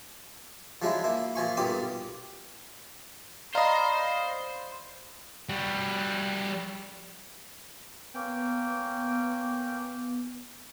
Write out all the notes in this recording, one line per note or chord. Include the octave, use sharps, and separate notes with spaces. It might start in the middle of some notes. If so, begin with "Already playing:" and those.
F3 F#3 G#3 D4 E4
A#3 E4
A#2 F3 G#5 C#6
B1 G2 A#2 G4 D5 D#6
C5 D5 D#5 F5 A#5 B5
G3 F#4
A#3 B3 C#4 G5